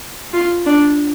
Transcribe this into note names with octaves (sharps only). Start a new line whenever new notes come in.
F4
D4